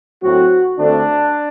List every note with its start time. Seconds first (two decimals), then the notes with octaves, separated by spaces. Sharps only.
0.22 A2 F#3 A3 C4 F#4
0.77 D2 D3 A3 C4 D4